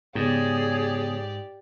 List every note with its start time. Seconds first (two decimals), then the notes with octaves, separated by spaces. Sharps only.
0.15 G#2 C#3 B3 G4 G#4 C#5 D5 D#6